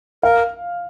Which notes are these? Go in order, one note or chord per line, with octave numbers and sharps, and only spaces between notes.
A#4 F5